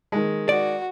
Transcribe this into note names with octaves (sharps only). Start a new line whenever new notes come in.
D#3 G#3
F#4 D5